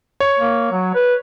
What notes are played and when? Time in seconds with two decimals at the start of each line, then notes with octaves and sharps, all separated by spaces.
0.20 C#5
0.39 A#3
0.72 F#3
0.94 B4